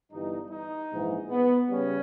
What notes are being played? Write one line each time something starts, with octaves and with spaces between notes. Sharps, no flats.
G1 G2 E3 G3 D#4
D#4
A#1 G#2 E3
B3
C#3 G3 C#4